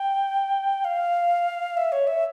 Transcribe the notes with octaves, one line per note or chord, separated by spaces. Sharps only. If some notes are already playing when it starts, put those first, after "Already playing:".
Already playing: G5
F5
E5
C#5
E5